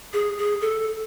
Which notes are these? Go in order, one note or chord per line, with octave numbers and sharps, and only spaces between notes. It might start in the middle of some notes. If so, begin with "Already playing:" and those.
G#4
G#4
A4